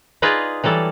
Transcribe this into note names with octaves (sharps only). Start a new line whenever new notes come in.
D#4 F4 G#4 B4 D5
E3 F#3 G3 A4